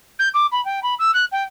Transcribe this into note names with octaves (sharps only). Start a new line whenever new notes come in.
G6
D6
B5
G5
B5
E6
F#6
G5